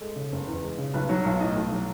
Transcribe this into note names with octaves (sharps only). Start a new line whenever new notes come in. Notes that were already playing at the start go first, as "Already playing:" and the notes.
G#3 A4
C#3
F#1
E2
G#3
C#3
B1 B4
F#3 C#5
B1 C#5
A2 D#5
B1
F#3